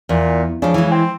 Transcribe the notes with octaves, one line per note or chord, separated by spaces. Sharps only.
E2 A#2
C#3 F3 D4
E3 G#3
C4